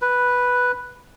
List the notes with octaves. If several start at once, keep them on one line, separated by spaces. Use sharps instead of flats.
B4